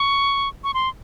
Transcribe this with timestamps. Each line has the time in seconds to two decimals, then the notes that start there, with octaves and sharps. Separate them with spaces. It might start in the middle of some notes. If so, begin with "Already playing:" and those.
Already playing: C#6
0.64 C#6
0.74 C6